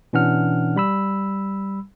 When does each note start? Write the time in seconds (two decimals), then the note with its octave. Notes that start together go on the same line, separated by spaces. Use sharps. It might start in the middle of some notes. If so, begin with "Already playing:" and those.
0.13 B2 E3 C#4 D4 F#5 F6
0.76 G3 B5 E6